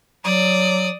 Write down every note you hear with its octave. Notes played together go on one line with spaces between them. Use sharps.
F#3 D5 D#6